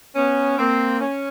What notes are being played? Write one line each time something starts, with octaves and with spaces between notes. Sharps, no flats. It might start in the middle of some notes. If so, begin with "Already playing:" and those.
B3 C#4
A#3 C4
C#4